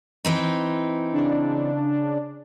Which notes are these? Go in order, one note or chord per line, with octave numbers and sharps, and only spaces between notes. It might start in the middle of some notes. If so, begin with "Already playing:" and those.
E3 C4 D#4
C#3 D4